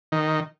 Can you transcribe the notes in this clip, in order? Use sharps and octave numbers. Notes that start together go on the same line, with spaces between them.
D#3